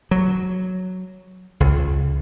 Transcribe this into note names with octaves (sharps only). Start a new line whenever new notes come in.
F#3
C#2